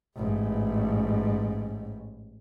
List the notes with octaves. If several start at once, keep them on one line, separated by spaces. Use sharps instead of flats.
A1 G#2